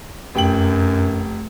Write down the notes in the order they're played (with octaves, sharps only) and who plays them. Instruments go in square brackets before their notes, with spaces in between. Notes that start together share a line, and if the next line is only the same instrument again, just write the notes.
[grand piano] F1 G5 F#7 [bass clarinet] F#2